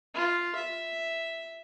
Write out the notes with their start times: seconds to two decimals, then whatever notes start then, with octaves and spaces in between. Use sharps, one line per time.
0.15 F4
0.56 E5